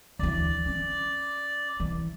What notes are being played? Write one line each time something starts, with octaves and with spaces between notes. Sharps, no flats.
D2 E3 D5
C#4
E3